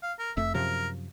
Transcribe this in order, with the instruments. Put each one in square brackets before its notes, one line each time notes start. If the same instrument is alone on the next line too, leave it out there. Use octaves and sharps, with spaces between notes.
[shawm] F5
A#4
[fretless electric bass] F1 F2 A3 [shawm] E5
[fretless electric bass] F#2 C3 F3 [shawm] A#4